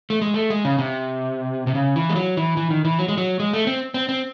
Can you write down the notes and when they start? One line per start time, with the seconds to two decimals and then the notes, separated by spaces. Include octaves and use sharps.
0.10 A3
0.22 G#3
0.34 A3
0.50 G#3
0.65 C#3
0.78 C3
1.67 C3
1.75 C#3
1.96 E3
2.09 G#3
2.16 F#3
2.37 E3
2.57 E3
2.71 D#3
2.85 E3
2.99 F#3
3.08 G#3
3.18 F#3
3.40 G#3
3.53 A3
3.67 C4
3.94 C4
4.09 C4